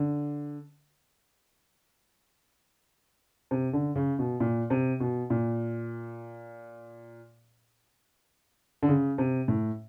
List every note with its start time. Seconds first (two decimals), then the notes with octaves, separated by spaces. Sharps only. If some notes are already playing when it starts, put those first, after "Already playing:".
Already playing: D3
3.51 C3
3.73 D3
3.95 C#3
4.19 B2
4.40 A#2
4.70 C3
5.00 B2
5.30 A#2
8.83 D3
8.89 C#3
9.18 C3
9.48 A2